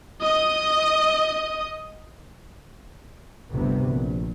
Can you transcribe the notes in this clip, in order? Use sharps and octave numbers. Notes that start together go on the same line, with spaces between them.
D#5 D#6
G1 D2 C3 B3
A#1